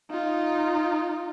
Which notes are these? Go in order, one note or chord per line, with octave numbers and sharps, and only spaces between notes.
D#4 F4